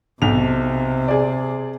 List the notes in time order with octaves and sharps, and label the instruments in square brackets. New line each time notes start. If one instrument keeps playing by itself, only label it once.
[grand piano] B1 F7 [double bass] C3
[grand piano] G#4 D5